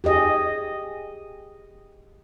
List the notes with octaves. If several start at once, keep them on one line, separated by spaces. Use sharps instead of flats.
G4 G#4 D#5